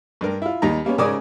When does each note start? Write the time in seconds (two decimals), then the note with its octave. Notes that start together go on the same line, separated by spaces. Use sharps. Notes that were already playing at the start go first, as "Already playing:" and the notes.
0.21 G2 D4 A#4
0.42 E4 F4
0.62 D#2 G3 D#4 A#5
0.85 G3 A#3 B3 C#4
0.98 G#2 C#3 A#4 D5 G#5 D#6